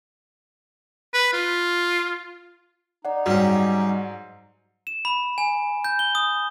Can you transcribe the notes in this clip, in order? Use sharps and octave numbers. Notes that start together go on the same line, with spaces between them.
B4
F4
D#4 D5 F#5
G#2 F#3 G3 C#4
E7
B5
G#5
G6
G7
D#6